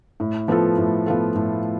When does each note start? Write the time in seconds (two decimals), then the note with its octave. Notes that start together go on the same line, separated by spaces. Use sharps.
0.20 A2
0.48 F3 B3 F4 A4
0.78 A2
1.06 F3 B3 F4 A4
1.36 A2